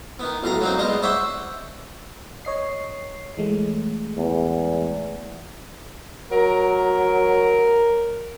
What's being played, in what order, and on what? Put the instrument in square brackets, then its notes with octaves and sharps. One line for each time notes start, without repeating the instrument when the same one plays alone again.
[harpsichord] D#3 B3
B1 A2 F5 A#5
F#3 A#3 C4 D#4
E2 G3 G#3 D#5
C5 C#5 E5 F#5 D6
[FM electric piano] C#5 D#5 C7
E3 G#3 A3
[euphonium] E2
[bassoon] F#3 [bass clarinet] A#4